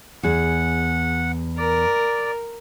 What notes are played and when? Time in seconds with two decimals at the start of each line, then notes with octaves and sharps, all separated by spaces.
0.23 E2 G#4 F#5
1.58 A#4 D5